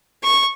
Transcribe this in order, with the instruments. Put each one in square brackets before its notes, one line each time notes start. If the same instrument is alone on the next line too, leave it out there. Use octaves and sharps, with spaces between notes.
[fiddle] C#6